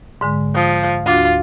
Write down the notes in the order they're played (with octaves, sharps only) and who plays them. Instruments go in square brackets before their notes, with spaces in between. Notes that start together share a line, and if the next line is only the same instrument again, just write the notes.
[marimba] G#2 D3 G#3
[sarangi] F3 [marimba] D#6
[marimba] D2 D4 F#4 [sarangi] F4